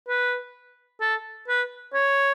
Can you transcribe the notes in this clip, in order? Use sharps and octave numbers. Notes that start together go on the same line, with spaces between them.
B4
A4
B4
C#5